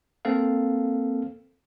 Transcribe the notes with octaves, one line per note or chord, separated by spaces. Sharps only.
A#3 C4 A4 F5